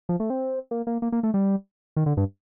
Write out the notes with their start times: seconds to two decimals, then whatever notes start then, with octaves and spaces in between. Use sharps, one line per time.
0.09 F3
0.20 A3
0.30 C4
0.71 A#3
0.87 A#3
1.02 A#3
1.12 A#3
1.23 A3
1.34 G3
1.96 D#3
2.06 D3
2.17 G2